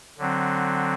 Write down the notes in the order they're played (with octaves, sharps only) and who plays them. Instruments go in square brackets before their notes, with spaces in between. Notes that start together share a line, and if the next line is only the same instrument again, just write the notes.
[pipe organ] D3 F#3 C4